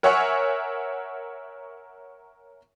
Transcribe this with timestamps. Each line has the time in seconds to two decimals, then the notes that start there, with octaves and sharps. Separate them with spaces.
0.03 A#4 C#5 E5 F#5 G#5 C#6